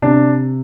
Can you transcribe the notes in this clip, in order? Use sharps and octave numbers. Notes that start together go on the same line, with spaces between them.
C3 D4